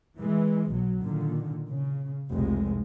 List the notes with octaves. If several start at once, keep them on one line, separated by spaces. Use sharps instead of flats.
E3 G#3
B1 F#3
A#2 D3 D#3
C#3
F1 C2 G#3